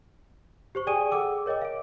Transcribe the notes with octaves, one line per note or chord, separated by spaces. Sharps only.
G4 C5 C#6
G#4 D5 G5 G#5 D#6 D#7
G#4 A4 F#5 G5 D6 E6
A#4 C#5 D#5 G5 D6
F5 D7